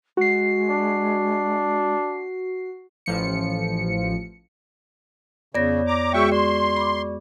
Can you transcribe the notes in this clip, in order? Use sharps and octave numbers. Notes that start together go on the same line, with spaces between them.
G#3 F#4 C7
D4
A1 F3 C#7
F2 C#3 B3 C#5 D5 A#6
A#5 D6
G#3 F#4 G#4 E5 G5 C#6
D5 C6 C#6
B5 D6